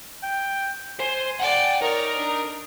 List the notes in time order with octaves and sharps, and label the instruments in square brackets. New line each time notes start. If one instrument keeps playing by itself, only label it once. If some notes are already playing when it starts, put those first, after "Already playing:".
[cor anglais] G5
[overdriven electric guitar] C5 [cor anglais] G#5
[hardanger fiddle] D5 A5 [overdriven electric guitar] F#5 G5
[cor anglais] D#4 [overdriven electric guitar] A#4 [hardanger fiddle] C#5 D5
[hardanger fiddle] D4